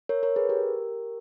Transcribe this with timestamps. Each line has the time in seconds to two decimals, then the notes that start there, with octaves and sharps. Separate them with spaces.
0.09 A#4 C#5
0.23 A#4 C#5
0.36 G#4 B4
0.49 G4 A#4